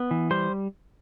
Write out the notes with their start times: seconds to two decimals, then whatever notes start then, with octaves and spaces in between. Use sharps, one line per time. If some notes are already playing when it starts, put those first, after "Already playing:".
Already playing: B3
0.11 E3
0.31 G3 C5